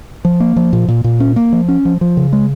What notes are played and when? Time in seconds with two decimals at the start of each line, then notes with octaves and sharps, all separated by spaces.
0.25 F3
0.40 A#3
0.56 F3
0.73 A#2
0.88 A#2
1.04 A#2
1.20 C#4
1.36 A#3
1.52 F3
1.69 C#4
1.85 F3
2.01 F3
2.17 C#3
2.33 G#3